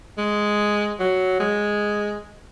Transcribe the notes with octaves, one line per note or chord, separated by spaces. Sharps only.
G#3
F#3
G#3